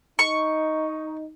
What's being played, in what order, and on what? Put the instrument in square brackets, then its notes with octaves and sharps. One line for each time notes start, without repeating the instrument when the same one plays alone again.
[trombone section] D#4 [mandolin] C#6